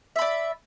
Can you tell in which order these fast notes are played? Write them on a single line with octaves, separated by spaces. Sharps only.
E5 B5 D5